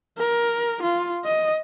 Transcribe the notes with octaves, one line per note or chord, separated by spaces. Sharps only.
A#4
F4
D#5